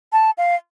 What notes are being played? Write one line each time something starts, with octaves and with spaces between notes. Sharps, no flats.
A5
F5